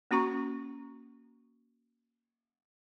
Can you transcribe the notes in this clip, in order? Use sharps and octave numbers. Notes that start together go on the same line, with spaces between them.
A#3 C#4 F#4 A#5 C#6